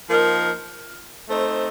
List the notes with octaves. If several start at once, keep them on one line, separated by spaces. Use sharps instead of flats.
F3 A#3 D#4 A#4
A3 C4 D#4 A4 C5